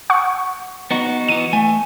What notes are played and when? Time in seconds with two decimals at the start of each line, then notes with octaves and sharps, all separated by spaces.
0.10 F#5 C#6
0.91 B3 D#4 F#4
1.28 E3 B3 D#7
1.53 A3 G#5